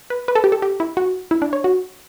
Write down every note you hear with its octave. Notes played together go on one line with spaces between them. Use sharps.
B4
B4
A4
G4
A4
G4
E4
F#4
E4
D4
C#5
F#4